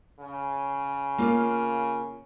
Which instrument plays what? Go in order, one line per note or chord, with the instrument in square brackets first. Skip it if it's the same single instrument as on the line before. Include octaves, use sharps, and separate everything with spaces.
[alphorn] C#3
[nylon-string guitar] A#3 F4